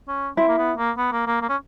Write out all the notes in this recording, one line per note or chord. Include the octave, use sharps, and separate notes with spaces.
C#4
C4 E4
A#3
B3
A#3
B3
A#3
A#3
A#3
C#4